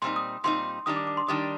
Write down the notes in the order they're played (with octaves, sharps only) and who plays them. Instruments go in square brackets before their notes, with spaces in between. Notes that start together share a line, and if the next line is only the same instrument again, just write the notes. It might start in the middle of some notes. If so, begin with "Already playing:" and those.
[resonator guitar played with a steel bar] A#2 G3 C4 D#4 [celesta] C6
[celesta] D#6
[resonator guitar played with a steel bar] A#2 G3 C4 D#4 [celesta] C6
[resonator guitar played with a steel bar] D#3 G3 D4 [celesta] D#6
[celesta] D6
D6
C6
[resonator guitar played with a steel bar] D#3 G3 D4 [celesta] D#6